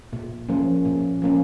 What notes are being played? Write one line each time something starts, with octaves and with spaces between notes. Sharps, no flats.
A#2
F3 A#3 C#4
A#2
F3 A#3 C#4